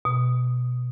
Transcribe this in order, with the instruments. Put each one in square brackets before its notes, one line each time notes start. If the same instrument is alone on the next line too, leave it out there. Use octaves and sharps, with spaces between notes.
[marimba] B2